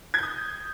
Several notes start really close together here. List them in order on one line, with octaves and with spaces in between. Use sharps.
G#6 G6 D#6